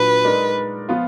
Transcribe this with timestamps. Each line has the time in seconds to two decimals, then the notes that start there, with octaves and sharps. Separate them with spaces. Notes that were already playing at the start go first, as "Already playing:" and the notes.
Already playing: A#2 F#3 D4 B4
0.25 G#3 D#4 A#4 D5
0.89 F3 B3 F4